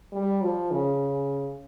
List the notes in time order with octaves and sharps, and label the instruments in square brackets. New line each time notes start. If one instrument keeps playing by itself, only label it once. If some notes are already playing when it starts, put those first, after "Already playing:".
[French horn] G3
F3
C#3